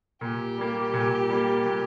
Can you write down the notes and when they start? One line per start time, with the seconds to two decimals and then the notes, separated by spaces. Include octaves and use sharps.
0.21 A#2 G4
0.58 G3 A#3
0.94 A#2
1.30 G3 A#3
1.66 A#2